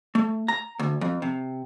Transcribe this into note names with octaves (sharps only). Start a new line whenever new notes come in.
A3
A#5
D2
F2
C3